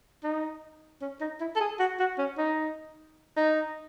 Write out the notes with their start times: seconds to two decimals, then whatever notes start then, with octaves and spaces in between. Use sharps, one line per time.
0.24 D#4
1.01 C#4
1.21 D#4
1.40 E4
1.56 A4
1.60 G#4
1.79 F#4
1.99 F#4
2.19 C#4
2.38 D#4
3.37 D#4